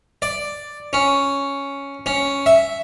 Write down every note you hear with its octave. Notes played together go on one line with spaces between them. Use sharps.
D5
C#4
C#4
E5